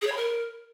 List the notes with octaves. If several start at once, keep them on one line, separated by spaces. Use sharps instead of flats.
G#4
C#5
B5
A#4